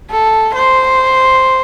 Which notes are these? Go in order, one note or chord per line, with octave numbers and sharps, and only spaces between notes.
A4
C5